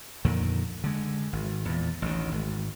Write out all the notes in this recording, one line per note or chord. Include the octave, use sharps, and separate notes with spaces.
F2 A#2 D3 D#3
D3 G#3
G#1
E2 A#2
A1 D2 D#3
G#1